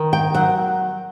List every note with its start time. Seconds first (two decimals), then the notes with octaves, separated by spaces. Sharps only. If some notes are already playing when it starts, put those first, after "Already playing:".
Already playing: D#3
0.13 G5
0.34 F#3 F#5